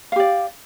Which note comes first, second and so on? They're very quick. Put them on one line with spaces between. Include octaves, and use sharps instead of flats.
F5 G4 D5